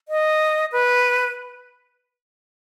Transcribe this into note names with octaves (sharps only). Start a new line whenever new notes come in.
D#5
B4